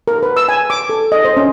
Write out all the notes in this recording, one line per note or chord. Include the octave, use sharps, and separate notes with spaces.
A#4
B4
E6
G#5
D6
A4
D#5
C5
C#4